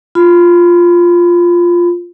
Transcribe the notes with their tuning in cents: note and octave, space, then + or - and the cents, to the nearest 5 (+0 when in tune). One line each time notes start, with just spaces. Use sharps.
F4 +0 B5 +20